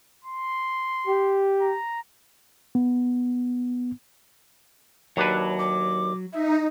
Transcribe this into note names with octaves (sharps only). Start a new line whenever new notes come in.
C6
G4
A#5
B3
D#2 F#3 D4 B4
D6
D#4 E5